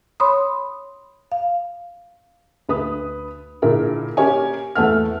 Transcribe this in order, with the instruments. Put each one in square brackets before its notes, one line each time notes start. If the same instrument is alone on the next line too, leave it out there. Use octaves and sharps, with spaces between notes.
[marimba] C#5 B5 C6 D#6
F5
[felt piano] D2 B4 D#6
A#2 D3 E4 G#4 A#4
A#3 C#4 G4 A#4 C#5 G#5
E2 A3 F#5 F6